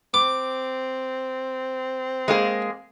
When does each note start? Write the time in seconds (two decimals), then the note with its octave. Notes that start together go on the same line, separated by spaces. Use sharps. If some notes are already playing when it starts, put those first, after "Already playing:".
0.14 C4 D6
2.28 G#3 A#3 G#4